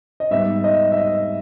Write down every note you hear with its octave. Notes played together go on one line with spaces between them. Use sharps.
D#5
G#2 G3 B3 E5
D#5
E5
D#5